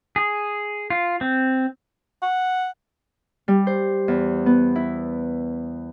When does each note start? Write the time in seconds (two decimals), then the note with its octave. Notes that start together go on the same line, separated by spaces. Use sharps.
0.16 G#4
0.90 F4
1.21 C4
2.23 F#5
3.48 G3
3.67 C5
4.08 E2
4.46 B3
4.76 E4